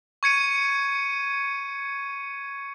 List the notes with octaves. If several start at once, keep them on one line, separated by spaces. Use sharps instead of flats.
C#6 G#6 C#7 D#7